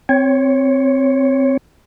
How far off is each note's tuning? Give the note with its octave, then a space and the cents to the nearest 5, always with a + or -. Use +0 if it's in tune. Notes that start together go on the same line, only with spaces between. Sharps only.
C4 +0 C#5 +0